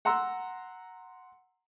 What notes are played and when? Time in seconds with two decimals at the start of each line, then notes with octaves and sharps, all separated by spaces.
0.05 F#5 A#5 C6 E6